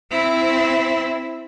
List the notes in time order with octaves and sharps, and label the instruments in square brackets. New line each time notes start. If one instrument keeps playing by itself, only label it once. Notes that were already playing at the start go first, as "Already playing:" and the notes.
[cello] C4 E4